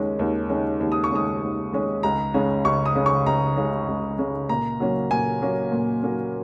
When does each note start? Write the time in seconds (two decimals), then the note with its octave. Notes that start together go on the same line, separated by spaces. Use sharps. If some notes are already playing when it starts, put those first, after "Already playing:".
Already playing: D#2 D#3 G#3 C#4
0.19 D#2
0.50 D#3 G#3 C#4
0.81 D#2
0.92 D#6
1.04 C#6
1.11 D#3 G#3 C#4 D#6
1.42 D#2
1.73 D#3 G#3 C#4
2.03 C#2 A#5
2.34 C#3 G#3 C#4
2.65 C#2 C#6
2.86 D#6
2.96 C#3 G#3 C#4
3.06 C#6
3.26 C#2 A#5
3.57 C#3 G#3 C#4
3.88 C#2
4.18 C#3 G#3 C#4
4.49 A#2 A#5
4.80 F#3 A#3 C#4
5.11 A#2 G#5
5.42 F#3 A#3 C#4
5.72 A#2
6.03 F#3 A#3 C#4